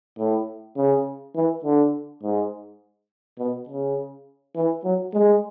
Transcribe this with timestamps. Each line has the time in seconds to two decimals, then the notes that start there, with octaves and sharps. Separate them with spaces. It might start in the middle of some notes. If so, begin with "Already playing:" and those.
0.19 A2
0.77 C#3
1.35 E3
1.64 D3
2.23 G#2
3.39 B2
3.69 C#3
4.56 E3
4.84 F#3
5.14 G#3